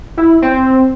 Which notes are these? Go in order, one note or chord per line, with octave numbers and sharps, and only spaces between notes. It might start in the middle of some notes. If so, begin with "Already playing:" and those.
E4
C4